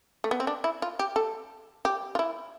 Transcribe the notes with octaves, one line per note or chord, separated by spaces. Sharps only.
A3
B3
C4
D4
E4
F4
G4
A4
G4
F4
E4